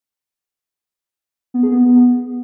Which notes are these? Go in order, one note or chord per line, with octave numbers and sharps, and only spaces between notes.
B3
G#4
B3